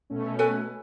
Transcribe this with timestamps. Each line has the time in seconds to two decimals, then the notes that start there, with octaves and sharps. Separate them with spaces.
0.10 B2 A3 C#4
0.39 A4 B4 G#5